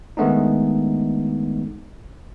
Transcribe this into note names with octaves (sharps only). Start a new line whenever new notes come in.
D#3 G#3 A3 B3 D4 D#4